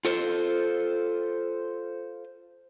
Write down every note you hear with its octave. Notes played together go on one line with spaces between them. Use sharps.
F4 A4 C5